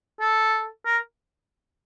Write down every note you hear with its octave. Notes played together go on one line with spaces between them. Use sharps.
A4
A#4